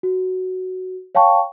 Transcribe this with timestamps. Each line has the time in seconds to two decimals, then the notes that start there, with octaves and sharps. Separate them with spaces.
0.03 F#4
1.15 C#5 F5 G5 A5 C#6